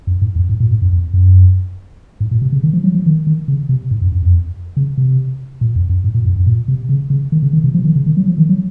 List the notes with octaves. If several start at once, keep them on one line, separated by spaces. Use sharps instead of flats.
F#2
G#2
F2
G#2
A#2
G#2
F#2
F2
F#2
G#2
A#2
C3
C#3
D#3
F3
F#3
F3
D#3
D#3
C#3
C3
G#2
F#2
F#2
F2
C#3
C3
A#2
F2
F#2
G#2
A#2
F#2
F#2
A#2
C3
C#3
C#3
D#3
C#3
D#3
C3
F3
D#3
C#3
D#3
F#3
F3
D#3
F#3